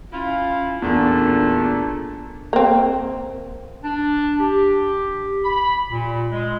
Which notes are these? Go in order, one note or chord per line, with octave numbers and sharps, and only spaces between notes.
C#4 E4 F4
E2 A#2 A3 D4 A4
A#3 C4
D4
G4
B5
A#2
G#3